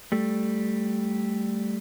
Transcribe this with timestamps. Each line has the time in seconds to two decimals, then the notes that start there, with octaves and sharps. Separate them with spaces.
0.12 G3 A3